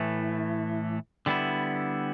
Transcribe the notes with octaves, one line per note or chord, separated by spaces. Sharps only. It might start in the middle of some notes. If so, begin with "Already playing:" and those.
Already playing: A2 E3 A3
D3 G3 B3 E4